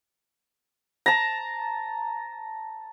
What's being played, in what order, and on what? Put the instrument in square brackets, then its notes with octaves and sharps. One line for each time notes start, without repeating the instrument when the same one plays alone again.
[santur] A5 A#5